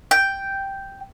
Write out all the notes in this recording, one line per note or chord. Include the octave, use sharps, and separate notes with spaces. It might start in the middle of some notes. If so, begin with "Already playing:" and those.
G5